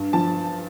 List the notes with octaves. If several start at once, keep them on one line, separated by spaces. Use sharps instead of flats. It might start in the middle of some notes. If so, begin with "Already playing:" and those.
Already playing: G2
F3 A5